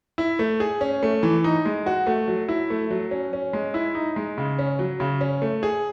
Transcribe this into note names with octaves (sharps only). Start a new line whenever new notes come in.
E4
A3
G#4
C#4
A3
E3
D#4
G#3
F#4
A3
F#3
E4
A3
F#3
C#4
C#4
G#3
E4
D#4
G#3
C#3
C#4
F#3
C#3
C#4
A3
G#4